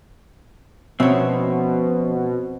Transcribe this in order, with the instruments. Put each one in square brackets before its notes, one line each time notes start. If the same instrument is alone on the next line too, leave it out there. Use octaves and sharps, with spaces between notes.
[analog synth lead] B2 [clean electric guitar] F3 C#4 E5 [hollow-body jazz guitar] C4 C#5